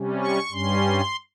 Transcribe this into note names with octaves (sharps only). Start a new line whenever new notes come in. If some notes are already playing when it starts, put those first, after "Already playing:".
Already playing: C3 G3 C#4
C#6
G2 G3 C#4 C6